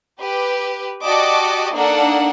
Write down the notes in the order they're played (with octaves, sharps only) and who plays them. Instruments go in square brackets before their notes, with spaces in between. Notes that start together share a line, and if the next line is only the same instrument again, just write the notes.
[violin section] G4 B4
F#4 G4 D5 D#5 A5 D6
A#3 D4 D#4 A4 A#4 F#5